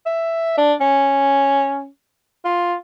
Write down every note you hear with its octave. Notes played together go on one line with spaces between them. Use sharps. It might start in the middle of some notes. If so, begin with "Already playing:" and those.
E5
D4
C#4
F4